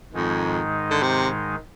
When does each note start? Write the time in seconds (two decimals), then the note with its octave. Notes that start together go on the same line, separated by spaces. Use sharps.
0.12 F2 G#2 D#3 G#3 D#4
0.91 D3
1.03 C3